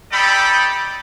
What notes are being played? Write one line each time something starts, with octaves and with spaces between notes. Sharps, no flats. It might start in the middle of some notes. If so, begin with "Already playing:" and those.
D#4 G4 A4 D5 G5 B5